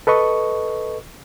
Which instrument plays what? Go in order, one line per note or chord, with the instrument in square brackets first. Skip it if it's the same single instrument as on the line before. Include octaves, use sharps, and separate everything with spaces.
[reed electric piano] A4 B4 D#5 C#6